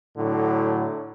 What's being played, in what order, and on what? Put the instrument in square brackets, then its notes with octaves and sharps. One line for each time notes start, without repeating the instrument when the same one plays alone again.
[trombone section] A2 D3 F#3